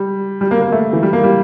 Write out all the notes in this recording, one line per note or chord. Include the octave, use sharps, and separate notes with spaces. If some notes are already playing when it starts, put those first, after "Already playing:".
Already playing: G3
G3
A#3
A#3
A3
E3
G3
A#3
G3